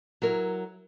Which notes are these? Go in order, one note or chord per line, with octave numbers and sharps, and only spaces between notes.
F#3 E4 A#4